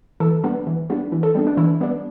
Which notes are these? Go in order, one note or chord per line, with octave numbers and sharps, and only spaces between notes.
E3 A4
G3 B3 D4
E3
G3 B3 D4
E3
A4
G3 B3 D4
D4
E3 E4
G3 B3 D4